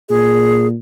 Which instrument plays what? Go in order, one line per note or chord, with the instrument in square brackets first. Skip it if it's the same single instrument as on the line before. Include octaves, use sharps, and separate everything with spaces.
[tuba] A#2 [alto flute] G#4